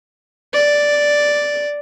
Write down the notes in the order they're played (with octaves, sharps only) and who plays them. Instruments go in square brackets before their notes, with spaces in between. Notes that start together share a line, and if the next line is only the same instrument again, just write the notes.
[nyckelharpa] D5